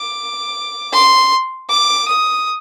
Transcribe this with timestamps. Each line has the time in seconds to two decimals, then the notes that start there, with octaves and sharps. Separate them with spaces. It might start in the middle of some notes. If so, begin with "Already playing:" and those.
Already playing: D6
0.93 C6
1.70 D6
2.08 D#6